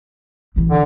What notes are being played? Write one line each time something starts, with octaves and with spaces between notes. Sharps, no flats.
A#1 E3
D3